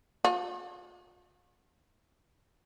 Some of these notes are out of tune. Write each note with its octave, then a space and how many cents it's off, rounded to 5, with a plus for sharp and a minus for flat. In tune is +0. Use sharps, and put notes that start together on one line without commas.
F4 +40